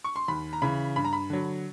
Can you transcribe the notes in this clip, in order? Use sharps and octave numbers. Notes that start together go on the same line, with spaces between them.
C#6
C6
D#2 B5
A#5
C#3 E3 B5
G2 B5
A#5
B5
D3 F#3